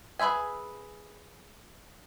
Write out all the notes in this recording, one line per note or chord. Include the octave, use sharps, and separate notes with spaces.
G#4 B4 C5 E5 G#5